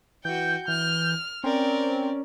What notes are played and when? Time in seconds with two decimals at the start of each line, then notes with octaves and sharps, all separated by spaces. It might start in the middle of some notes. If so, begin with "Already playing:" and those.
0.25 E3 F#4 G5 G6
0.68 E3 F6
1.44 C4 C#4 A#4 D5